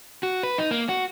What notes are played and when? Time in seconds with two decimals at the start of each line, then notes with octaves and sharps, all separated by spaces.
0.23 F#4
0.43 B4
0.58 D#4
0.71 A#3
0.89 F#4